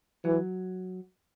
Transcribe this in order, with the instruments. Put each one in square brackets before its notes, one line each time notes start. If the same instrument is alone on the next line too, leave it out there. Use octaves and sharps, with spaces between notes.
[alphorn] E3 [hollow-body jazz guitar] F#3